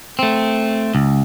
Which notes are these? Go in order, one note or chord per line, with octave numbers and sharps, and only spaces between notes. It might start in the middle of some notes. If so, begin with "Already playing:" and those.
A3 C4
C#2